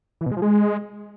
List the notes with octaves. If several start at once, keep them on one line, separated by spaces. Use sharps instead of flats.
E3
B2
G#3
F3
G#3